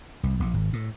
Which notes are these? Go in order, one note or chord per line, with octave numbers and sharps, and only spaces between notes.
C2
A#1
G#1
A2